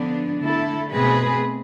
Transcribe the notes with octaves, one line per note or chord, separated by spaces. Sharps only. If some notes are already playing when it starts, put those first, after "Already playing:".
Already playing: D3 F3 B3 D4
D3 A3 E4 A4
B2 A3 C4 G#4 B4